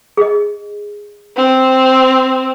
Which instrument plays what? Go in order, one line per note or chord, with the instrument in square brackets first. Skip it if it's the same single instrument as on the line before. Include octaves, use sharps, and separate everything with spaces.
[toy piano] G#4 D#5
[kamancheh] C4